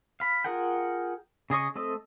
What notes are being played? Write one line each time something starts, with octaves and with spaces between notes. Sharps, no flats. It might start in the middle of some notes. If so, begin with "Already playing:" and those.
F5 B5
F4 G#4 A#4 F#5 G5
C#3 G#4 D#5 C#6
A3 C4 A4 D#5